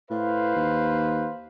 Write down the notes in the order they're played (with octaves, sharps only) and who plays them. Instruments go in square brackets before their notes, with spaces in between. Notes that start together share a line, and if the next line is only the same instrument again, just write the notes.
[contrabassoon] A2 [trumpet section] B4 C5 F5
[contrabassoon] D#2